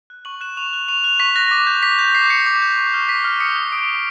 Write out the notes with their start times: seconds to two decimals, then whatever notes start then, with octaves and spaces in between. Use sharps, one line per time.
0.10 F#6
0.25 C#6 F#7
0.41 F#6 E7
0.57 C#6 F7
0.73 F#6
0.88 C#6 F7
1.04 F#6 F7
1.20 C#6 B6
1.36 F#6 A#6
1.51 D6
1.67 G6
1.83 D6 B6
1.99 G6
2.15 D6 C7
2.30 G6 C#7
2.46 D6
2.62 G6
2.78 C#6
2.94 F6
3.08 C#6 B6
3.24 F6
3.40 D#6 C#7
3.56 G6
3.72 D#6 D7
3.88 G6